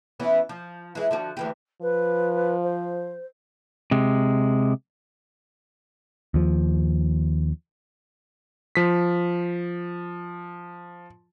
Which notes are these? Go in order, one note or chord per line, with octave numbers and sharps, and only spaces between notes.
E3 B3 C#4
F3
E3 G#3
D3 F3 F#4
D2 E3 G4
F3 B4
C5
C3 G#3
D#2 F3
F3 B6